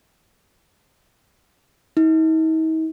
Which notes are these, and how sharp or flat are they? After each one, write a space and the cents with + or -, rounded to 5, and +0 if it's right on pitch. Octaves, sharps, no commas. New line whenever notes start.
D#4 +45